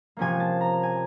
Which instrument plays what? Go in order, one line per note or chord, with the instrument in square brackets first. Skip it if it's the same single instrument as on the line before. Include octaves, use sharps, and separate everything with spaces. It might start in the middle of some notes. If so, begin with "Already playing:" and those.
[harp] C3 F3 A#3 C#4 G#5
A5
A#5
G#5